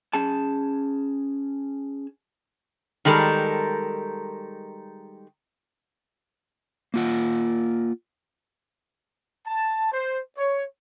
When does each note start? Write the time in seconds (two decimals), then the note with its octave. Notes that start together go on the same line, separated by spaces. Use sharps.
0.13 C#4 G#4 A5
3.05 D#3 G3 G#3 A4 A#4
6.94 A#3 F4 F#5
9.46 A5
9.92 C5
10.37 C#5